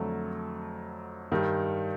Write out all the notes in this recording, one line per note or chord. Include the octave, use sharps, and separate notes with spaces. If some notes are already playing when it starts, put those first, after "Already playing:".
Already playing: F2 D3 F#3 A3
G2 D#3 G3